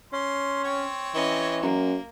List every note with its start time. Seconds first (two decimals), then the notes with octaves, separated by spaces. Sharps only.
0.13 C#4 C6
0.64 C4 C#5
1.15 E3 C#4 D#5
1.63 F#2 A#3